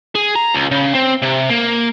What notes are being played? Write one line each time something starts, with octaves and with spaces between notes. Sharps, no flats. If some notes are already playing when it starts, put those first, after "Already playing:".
G#4
A#5
C#2
C#3
C4
C3
A#3